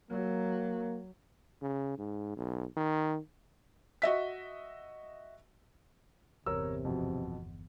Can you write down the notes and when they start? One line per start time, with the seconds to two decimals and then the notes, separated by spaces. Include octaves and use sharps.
0.11 F#3 A#3
1.62 C#3
1.98 G#2
2.37 B1
2.77 D#3
4.02 F#4 D#5 E5 B6
6.46 G1 E2 C3 A#4 C#5 E6
6.85 F2 B2